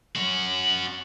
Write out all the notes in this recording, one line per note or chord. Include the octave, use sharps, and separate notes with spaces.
C#4 F#4